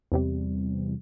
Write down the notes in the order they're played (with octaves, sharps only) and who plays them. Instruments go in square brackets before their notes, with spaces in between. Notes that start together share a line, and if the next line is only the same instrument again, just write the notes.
[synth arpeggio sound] E2 C3 G3